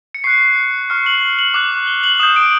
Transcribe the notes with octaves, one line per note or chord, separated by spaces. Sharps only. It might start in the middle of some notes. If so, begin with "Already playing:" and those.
C#7
C#6 F#6 C7
C#6 F6 C#7
F#7
F#7
D6 F#6
G7
F#7
D#6 G6 E7
D7